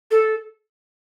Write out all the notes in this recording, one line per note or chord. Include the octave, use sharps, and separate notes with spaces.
A4